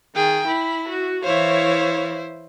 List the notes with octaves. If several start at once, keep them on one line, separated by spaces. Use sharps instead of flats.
D#3 G#4 G5
E4 B5
F#4
E3 E4 C5 C#5 F5